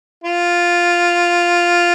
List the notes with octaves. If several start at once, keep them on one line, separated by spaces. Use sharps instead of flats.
F4